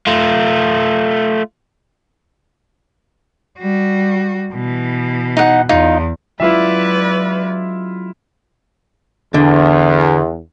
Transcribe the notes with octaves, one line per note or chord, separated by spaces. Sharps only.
A3 F4
G3 F#4
B2 E3
D#4 F#5
E2 D#4 F4
F#3 G#3 C#4 E4 F4 B4 D5 E5
E2 D3